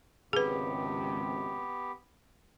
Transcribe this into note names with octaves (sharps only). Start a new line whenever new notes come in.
G#1 C#2 C3 B3 G4 G#4 B4